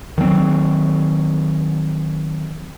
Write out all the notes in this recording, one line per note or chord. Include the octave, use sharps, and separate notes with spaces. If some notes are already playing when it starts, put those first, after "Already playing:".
D#3 F#3 A3 C4